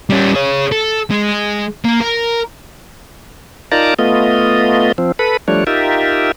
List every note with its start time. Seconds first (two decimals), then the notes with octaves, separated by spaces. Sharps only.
0.10 G3 C#4
0.35 G#4 C#5
0.72 A4
1.11 G#3
1.85 A#3
2.00 A#4
3.72 D#4 F4 A#4 D5 A5 A#5
3.99 A3 B3 F4 D#5
4.98 F3 C4
5.19 A4 B4 B5
5.48 F3 G3 A3 D4 C#5
5.67 D#4 F4 G4 A#4 E5